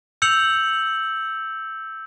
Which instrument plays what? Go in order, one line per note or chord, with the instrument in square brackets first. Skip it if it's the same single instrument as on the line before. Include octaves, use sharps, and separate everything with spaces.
[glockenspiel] E6 G6 C#7 F7 F#7